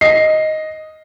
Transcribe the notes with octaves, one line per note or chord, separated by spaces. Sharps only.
D#5 C7